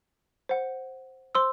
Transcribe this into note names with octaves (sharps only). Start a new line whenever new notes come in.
C5 F#5
C5 C6 E6